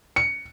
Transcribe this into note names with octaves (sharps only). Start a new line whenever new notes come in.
C#7